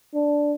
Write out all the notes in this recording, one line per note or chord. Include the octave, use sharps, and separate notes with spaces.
D4